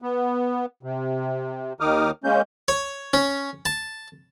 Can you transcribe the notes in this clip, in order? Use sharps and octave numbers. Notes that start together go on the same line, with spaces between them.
B3
C3
D#2 D#3 D#4 D6 D#6 F6
G#3 A#3 C#4 G6
C#5
C#4
A5